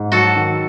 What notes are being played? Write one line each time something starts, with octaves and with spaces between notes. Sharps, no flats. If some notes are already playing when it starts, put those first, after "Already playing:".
Already playing: G#2
F#3 F#4 A4
D#3